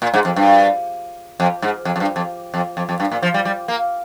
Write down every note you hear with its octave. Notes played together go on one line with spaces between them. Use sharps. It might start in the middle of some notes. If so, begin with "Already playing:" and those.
A#2
G#2
F2
G2
F2
G#2
F2
F2
G2
F2
F2
F2
F2
G2
A#2
F3
G3
G3
A#3